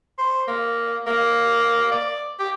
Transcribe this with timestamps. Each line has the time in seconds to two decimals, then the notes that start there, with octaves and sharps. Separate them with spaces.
0.18 C5
0.48 A#3
1.07 A#3
1.91 D5
2.40 G4